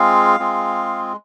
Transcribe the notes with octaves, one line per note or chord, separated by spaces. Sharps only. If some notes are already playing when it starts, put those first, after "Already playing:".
Already playing: G#3 C4 F4 G#4 F5
G#3 C4 F4 G#4